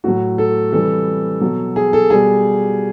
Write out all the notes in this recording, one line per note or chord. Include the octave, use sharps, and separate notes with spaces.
A2 F#3 F#4
A4
C3 E3 G3 A4
B2 F#3
G#4
A4
B2 G3 G#4